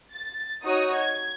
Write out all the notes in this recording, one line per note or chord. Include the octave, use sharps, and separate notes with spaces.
A6
D#4 F#4 C#5 D#6
G#6